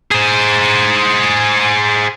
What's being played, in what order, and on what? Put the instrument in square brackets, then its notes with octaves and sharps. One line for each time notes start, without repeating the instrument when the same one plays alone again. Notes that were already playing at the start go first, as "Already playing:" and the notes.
[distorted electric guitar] G#4 C5